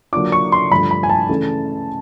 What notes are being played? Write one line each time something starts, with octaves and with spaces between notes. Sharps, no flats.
D3 F#3 A#3 D4 F4 D6
C#6
C6
G2 D3 F3 A3 B5
B5
G#5
A5
C#3 E3 A3